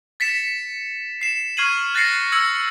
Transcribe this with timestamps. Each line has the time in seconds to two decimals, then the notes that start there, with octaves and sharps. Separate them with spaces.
0.20 A6 B6 C#7 E7
1.21 C7 E7
1.57 C#6 F6 G#6 C7 D#7 F#7
1.95 F#6 A6 A#6 C7 C#7
2.32 E6 G#6 C#7 F#7